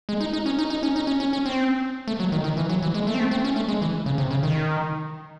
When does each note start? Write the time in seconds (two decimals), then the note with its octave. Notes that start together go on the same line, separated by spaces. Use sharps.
0.09 G#3
0.21 D#4
0.33 D#4
0.46 C#4
0.59 D#4
0.70 D#4
0.83 C#4
0.96 D#4
1.07 C#4
1.20 C#4
1.33 C#4
1.46 C4
2.08 A3
2.20 F#3
2.32 D#3
2.44 D#3
2.57 E3
2.69 F#3
2.82 E3
2.94 G#3
3.07 A3
3.14 C4
3.20 A3
3.31 C4
3.44 C#4
3.56 A3
3.68 G#3
3.82 E3
4.06 C#3
4.18 C3
4.31 C#3
4.43 D#3